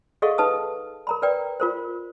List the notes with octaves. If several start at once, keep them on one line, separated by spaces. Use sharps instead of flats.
G#4 A4 D#5 F5 F#5 C#6
D#4 B4 A5 D#6
A#4 A#5 B5
A#4 B4 D5 G5
F4 A#4 C5